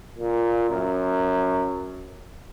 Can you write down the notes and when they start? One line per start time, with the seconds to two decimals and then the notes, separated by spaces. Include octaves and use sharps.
0.18 A#2
0.70 F#2